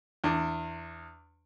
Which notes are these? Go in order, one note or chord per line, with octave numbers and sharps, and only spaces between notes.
E2 D4